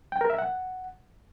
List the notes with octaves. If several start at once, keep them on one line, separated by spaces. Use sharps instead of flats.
G5
A#4
E5
F#5